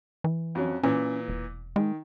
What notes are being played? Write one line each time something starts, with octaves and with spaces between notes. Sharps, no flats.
E3
F2 F#3 C#4
A#2 E3 C#4
E1
D#3 G#3